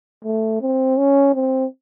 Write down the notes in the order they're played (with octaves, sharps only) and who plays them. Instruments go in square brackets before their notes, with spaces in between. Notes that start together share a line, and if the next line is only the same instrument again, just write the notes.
[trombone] A3
C4
C#4
C4